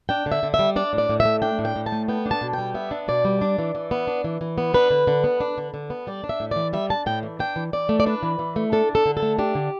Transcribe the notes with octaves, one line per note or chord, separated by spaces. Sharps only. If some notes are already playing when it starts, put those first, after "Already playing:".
D4 G5
D3
E5
D3
E5
G3
D4 D5
A2
D5
A2
E5
A3
D4 G5
A2
G5
A2
A5
A3
B3 G5
D4
A5
B2
G5
G3
B3 E5
D4
B2 D5
G3
D4
E3
E3
B3
D4
E3
E3
B3
D4 B4
D3
D3
B3
D4
D3
D3
B3
G3 D5
D4
E5
A2
E3 D5
G3 E5
D4 A5
A2 G5
E3
D4 G5
E3
E3 D5
A3
D5
D4 B4
E3
E3
A3
D4 A4
D3
A4
D3
A4
A3
D4 G4
D3